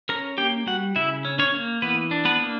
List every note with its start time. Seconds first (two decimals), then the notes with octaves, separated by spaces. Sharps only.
0.09 C#4 A#4 A#5
0.38 A#3 G4 G5
0.66 G3 F#4 F#5
0.96 C#3 E4 E5
1.25 C#4
1.39 C#4 C#5
1.54 A#3
1.82 E3 B3 B4
2.11 D4
2.25 B3 B4
2.40 A#3